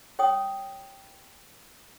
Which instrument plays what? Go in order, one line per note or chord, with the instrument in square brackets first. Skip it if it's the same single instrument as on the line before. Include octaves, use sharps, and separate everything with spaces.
[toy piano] C#5 G5 D#6